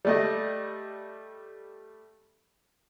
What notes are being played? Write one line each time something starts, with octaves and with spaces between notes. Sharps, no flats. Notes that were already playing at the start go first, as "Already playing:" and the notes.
G3 A3 D#5